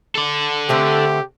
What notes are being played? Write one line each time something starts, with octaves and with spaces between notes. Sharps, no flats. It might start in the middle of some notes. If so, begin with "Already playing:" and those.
A4 D5
D3 A3 C4 G4